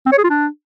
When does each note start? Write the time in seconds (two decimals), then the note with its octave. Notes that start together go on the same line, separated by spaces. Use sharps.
0.06 C4
0.12 C#5
0.18 G#4
0.24 F4
0.30 D4